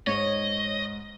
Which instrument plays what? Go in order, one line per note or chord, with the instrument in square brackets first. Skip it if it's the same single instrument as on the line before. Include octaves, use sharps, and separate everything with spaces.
[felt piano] G#2 [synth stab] C#5 [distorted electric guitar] D#5